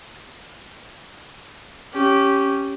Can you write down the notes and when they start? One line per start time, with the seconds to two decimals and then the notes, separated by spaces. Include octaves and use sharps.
1.93 C#4 G4